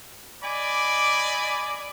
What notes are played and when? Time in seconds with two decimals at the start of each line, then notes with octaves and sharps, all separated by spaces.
0.43 D5 D#5 G#5 B5 D6